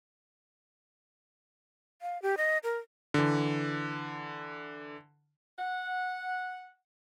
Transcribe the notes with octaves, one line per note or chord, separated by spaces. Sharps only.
F5
G4
D#5
A#4
D3 E3
F#5